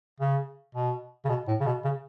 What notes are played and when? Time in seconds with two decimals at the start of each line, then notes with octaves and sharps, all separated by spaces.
0.20 C#3
0.75 B2
1.25 C#3
1.29 B2
1.48 A2
1.60 C#3
1.66 B2
1.84 C#3